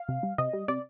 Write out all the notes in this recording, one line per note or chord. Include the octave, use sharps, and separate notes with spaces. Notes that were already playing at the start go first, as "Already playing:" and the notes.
Already playing: F5
C3
G3
C3 D#5
G3
C3 D5